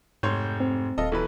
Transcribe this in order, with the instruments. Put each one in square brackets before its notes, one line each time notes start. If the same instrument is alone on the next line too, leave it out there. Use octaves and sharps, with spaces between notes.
[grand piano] F1 C#5 C6 [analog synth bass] G#2 [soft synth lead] G6
[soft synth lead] C4
[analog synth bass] D#1 [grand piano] F4 A4 D#5
[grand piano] B1 E3 B4 [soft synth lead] A4